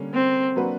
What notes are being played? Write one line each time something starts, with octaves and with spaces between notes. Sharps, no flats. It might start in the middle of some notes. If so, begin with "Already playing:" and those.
Already playing: D3 G3 A#3 C#4
C4
F#3 A#3 D4 F#4 B4